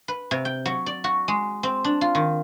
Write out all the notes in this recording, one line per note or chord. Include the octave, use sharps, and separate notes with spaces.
B4
C3
G5
F#3
D5
F#4
G#3
C4
D4
F4
D#3